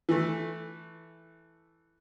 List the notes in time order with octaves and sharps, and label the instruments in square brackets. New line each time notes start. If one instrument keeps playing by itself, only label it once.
[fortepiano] E3 A3